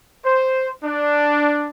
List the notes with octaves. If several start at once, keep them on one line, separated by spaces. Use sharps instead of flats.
C5
D4